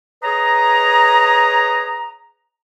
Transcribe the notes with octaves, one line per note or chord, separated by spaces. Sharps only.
G#4 B4 C#5 D#5 A#5